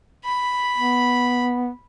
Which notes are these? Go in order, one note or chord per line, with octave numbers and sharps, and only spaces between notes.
B5
B3